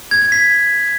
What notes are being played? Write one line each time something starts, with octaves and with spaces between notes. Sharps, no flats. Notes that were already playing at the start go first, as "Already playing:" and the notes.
G#6
G#6
B6